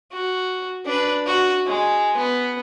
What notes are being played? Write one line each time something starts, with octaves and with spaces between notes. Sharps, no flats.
F#4
D4 B4
F#4
G#3
B3